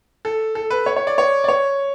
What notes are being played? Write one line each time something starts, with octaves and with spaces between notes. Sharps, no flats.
A4
A4
B4
C#5
C#5
D5
C#5
D5
C#5